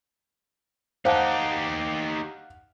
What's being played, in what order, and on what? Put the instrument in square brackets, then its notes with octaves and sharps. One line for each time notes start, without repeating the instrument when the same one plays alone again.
[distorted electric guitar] D#4 G4 [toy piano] C5 A5 [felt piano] F5 F#5